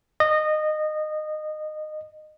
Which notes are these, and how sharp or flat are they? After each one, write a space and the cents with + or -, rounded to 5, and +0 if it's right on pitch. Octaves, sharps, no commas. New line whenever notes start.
D#5 -20